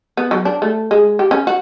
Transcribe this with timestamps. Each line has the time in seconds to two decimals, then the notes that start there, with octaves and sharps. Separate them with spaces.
0.17 B3
0.31 F#3
0.45 D4
0.62 A3
0.91 G#3
1.19 G4
1.31 C#4
1.47 F#4